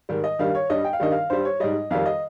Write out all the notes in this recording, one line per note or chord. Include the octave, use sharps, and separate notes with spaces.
G#2 D#3 G3
D#5
G2 D#3 G3 F5
C#5
G2 G3 D#5
G5
F5
G2 D#3 G3 D#5
F5
G2 G3 C5
C#5
G#2 G3 D#5
F2 D#3 G3 F5
D#5